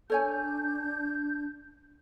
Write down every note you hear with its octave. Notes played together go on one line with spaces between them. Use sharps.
D4 A4 C#5 G#5 G6